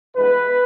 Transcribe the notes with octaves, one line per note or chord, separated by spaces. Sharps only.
G2 E3 G#3 B3 B4